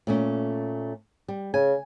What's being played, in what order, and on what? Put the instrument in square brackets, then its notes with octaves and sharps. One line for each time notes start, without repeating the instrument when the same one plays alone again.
[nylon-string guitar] A#2 A3 C#4
G3
[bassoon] C#3 [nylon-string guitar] G#5